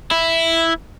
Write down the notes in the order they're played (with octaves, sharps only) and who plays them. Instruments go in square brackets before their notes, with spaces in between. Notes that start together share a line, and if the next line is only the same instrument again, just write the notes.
[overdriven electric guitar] E4